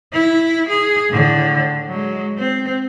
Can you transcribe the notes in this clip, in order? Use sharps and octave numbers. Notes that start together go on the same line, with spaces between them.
E4
G#4
A2 D3
F#3 G#3
C4